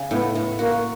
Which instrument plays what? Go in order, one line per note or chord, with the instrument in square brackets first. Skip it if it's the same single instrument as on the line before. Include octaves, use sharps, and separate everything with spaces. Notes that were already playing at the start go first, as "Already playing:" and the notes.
Already playing: [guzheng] C#3
[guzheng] A2 [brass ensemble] B3
[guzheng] A2
[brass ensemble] A#3 [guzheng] F#4